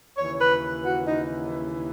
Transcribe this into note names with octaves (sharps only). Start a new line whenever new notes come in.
D#2 C#3 E3 C#5
B4
F#4
D#4